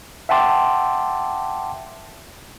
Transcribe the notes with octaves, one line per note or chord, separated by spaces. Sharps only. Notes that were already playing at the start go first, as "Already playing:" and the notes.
E5 F#5 G5 A5 C6 D6